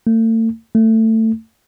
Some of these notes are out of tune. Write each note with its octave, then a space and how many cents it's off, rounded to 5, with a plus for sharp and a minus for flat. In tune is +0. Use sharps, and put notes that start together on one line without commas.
A3 +40
A3 +20